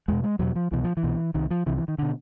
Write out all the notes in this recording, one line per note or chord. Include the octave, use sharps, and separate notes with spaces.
E2 B2 G#3
G#3
E2 B2 F#3
F3
C2 B2 E3
F3
E3
C2 B2
C2 C3 D#3
F3
C2 C3 E3
E3
D#3
B2 D3